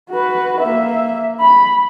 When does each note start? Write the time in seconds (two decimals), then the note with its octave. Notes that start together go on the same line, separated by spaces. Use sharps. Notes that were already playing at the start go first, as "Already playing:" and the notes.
0.10 F#4 B4
0.61 A#3 E5
1.40 B5